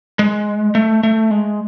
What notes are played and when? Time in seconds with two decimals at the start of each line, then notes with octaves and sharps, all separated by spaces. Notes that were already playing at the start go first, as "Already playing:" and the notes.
0.19 G#3
0.75 A3
1.03 A3
1.31 G#3